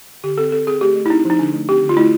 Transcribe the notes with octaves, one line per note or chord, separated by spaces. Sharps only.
D3 G4
C4 A4
C4 A4
C4 G#4
A3 G4
A3
E4
C4 D#4
F3 D#4
D3 D4
A3
C4 G4
D3
F4
A3 E4